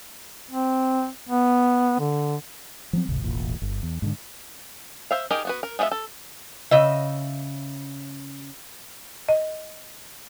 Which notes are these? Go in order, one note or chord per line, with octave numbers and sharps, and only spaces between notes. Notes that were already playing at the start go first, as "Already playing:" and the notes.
C4
B3
D3
F3 F#3 C4
D#1 G#1 D2 C3
E1 A1 A#2
G1
E2
G#2 B2 D3
C5 E5 F5
D#4 G4 G#4 A#4 D#5
B3 F#4 B4
A#4
G#3 B3 D4 F4 E5
A4
C#3 D#5 E5
D#5